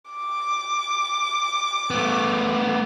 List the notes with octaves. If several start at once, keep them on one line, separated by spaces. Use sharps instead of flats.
D6
A3 B3